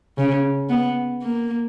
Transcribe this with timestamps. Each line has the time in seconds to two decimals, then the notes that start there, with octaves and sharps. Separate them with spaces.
0.18 C#3
0.69 B3
1.22 A#3